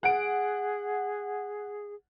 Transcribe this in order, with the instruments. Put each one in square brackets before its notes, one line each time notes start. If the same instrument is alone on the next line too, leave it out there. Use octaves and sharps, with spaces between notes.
[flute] G#4 [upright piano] F#5 D7